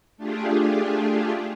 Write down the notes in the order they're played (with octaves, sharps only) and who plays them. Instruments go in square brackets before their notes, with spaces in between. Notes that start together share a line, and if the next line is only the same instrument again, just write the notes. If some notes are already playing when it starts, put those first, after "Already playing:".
[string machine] A3 D4 F4 G4 G#4